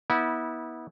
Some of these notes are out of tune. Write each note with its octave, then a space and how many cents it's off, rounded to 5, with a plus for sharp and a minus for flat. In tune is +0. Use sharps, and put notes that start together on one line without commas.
B3 -20 E4 -30